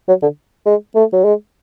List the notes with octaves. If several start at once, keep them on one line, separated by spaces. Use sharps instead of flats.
F#3
D3
G#3
A3
F#3
G#3